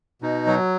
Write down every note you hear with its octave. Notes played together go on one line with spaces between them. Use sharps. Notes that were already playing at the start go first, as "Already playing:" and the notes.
B2 D#4
F#3